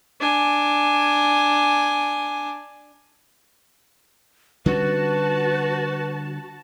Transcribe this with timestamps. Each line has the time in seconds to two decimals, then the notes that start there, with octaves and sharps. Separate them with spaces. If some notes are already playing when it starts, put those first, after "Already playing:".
0.20 D4 G#5
4.66 D3 G3 C#4 F#4 B4 A5